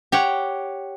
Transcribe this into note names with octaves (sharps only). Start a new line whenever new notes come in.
G4 C#5 F#5 G5